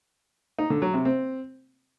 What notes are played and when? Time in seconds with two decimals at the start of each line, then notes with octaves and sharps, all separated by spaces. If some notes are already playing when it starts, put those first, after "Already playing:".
0.58 D#4
0.70 D3
0.82 F#3
0.94 C3
1.05 C4